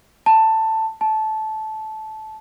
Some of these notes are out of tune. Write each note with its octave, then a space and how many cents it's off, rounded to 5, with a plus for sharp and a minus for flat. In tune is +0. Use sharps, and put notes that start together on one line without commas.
A5 +10
A5 -15